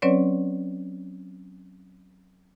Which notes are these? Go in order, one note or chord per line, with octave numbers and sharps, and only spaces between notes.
F#3 C4 C#4 B4 C#5 D5